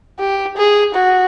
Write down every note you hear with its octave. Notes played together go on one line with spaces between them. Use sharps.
G4
G#4
F#4